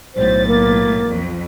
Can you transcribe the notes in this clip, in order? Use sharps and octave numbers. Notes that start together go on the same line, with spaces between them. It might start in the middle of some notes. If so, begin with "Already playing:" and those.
B1 A2 C5 A6
A#3
F2